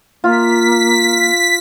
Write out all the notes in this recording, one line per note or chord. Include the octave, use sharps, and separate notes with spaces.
A#3 F4 B6